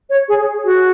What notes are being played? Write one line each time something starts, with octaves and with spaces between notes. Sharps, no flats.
C#5
G#4
G#4
F#4